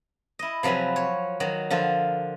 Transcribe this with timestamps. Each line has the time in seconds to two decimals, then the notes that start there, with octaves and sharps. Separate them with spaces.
0.39 E4 D#5
0.63 C3 F3 F#3 B4 G#5
0.96 C#5
1.40 D#3 F#3
1.70 D3 F3 F4 A#4